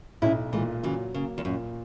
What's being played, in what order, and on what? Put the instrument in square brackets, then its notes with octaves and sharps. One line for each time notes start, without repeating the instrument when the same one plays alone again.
[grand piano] B1 [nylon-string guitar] C#4 E4
[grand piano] A#2 [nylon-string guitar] E3 G#3
[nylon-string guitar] C#3 E3 [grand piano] F#3
[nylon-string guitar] C#3 [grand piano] A#3
[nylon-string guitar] E2
[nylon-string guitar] F#2 [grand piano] A#2